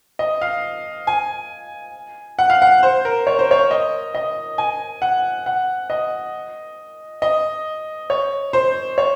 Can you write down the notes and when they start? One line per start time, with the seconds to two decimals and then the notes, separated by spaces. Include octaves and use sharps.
0.19 D#5
0.42 F5
1.07 G#5
2.39 F#5
2.50 F5
2.62 F#5
2.83 C5
3.05 A#4
3.27 C#5
3.39 C5
3.51 C#5
3.71 D#5
4.15 D#5
4.58 G#5
5.02 F#5
5.46 F#5
5.90 D#5
7.22 D#5
8.10 C#5
8.53 C5
8.98 C#5